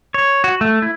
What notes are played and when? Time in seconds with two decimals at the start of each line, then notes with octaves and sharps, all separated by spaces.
0.14 C#5
0.44 F#4
0.61 A3
0.82 E4